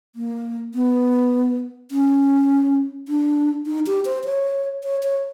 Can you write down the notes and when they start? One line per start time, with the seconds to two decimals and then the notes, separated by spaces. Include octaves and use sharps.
0.16 A#3
0.74 B3
1.91 C#4
3.08 D4
3.66 D#4
3.87 G4
4.05 C5
4.25 C#5
4.83 C#5
5.03 C#5